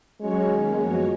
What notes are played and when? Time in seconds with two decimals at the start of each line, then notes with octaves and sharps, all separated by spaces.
0.20 F#3 G#3 C#4 F#4 C#5
0.49 D#3 A#3 C#4
0.77 F#2 F3 G#3 B3 F#4 C#5